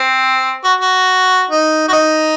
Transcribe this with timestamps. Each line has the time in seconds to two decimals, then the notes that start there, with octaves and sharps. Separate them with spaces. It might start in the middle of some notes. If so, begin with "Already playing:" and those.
Already playing: C4
0.64 F#4
0.81 F#4
1.50 D#4
1.88 F#4
1.93 D#4